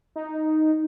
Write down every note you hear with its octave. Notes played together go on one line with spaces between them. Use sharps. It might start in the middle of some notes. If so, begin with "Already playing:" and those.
D#4